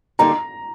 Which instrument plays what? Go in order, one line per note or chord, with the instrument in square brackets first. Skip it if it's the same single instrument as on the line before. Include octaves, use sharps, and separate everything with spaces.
[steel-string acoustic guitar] D3 G3 A#3 D#4 [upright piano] A#5